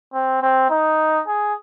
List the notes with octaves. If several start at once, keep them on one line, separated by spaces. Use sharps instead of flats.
C4
C4
D#4
G#4